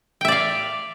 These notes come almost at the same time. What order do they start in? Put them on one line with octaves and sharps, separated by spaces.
G5 E5 D5 F5